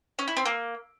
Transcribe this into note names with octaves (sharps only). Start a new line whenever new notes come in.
C#4
E4
C4
A#3